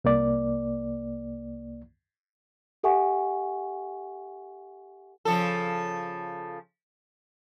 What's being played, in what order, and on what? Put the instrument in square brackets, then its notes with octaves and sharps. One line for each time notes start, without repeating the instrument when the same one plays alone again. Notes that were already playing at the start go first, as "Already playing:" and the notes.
[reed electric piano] C2 A#3 D5
[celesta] G4 A4 E5 F#5 G#5 C#6
[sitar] C#3 F3 A4